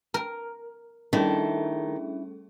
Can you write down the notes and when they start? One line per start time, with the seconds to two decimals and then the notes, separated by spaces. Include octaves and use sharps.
0.14 A#4
1.13 D#3 G3 A3 C#4 D4 E4 G#4